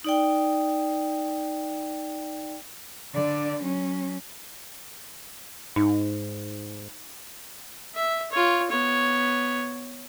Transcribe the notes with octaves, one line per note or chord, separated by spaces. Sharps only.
D#4 D5 G5
D3 D5
F#3 C#4
G#2 D#4
E5
F4 C#5
B3 C#5